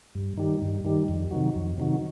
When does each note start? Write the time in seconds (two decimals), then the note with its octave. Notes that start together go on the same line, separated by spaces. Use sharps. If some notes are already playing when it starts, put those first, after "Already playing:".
0.15 G2
0.37 D#3 G3
0.62 G2
0.85 D#3 G3
1.08 F2
1.31 C3 D#3 F#3
1.55 F2
1.78 C3 D#3 F#3